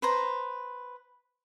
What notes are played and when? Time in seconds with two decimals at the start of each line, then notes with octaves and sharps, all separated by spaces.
0.02 B4 C5 A#5